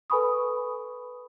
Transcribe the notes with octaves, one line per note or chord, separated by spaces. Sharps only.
A4 B4 G#5 B5 C#6 D#6